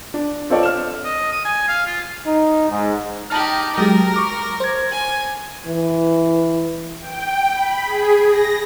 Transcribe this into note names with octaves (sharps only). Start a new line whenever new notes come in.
D4
C4 F4 A4 C#5 D5 F5
F6 E7
D#5
D#6
G#5
F5
F4
D#4
G#2
D#4 G4 A5 F6
F#3 G#3 G4 A#4
C#6 D6 F6
C5 G#6
G#5
E3
G5
B5
G#4
A#6